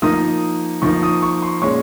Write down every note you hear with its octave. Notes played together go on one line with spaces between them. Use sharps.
F3 A#3 D#4 D#6
F3 A#3 D#4 C#6
D#6
C#6
C6
A#2 G#3 C#4 C#6